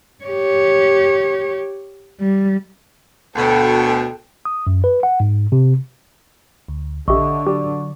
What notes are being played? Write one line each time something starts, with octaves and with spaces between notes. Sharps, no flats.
G4 C#5
G3
D2 B2 A4 G5
D#6
F#2
B4
F#5
G#2
C3
D2
A#1 D3 G4 D#5 E5 C#6
F#3 G4 D5